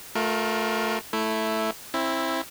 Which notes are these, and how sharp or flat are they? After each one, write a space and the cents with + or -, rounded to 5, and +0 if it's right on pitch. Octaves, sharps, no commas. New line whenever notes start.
A3 +0 F4 +30 A#4 +15
A3 +0 E4 +0
C4 +25 E4 +0